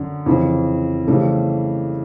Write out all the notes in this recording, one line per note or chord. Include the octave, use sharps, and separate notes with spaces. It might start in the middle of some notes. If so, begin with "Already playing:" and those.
Already playing: F#2 D3
F2 C#3 E3
F2 C#3 E3 G3 A3